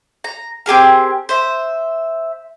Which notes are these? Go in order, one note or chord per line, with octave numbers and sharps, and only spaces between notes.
A#5
C4 G4 G#4 A#4
C5 E5